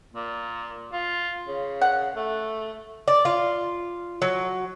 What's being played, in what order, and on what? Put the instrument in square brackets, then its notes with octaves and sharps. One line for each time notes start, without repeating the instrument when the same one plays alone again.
[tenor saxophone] A#2
F4
C#3
[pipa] F#5
[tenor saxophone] A3
[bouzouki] D5
F4
F#3